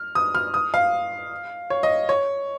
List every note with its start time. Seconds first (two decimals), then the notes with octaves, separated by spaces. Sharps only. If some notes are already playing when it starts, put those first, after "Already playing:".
Already playing: F6
0.15 D#6
0.35 F6
0.54 D#6
0.74 F5
1.70 C#5
1.83 D#5
2.09 C#5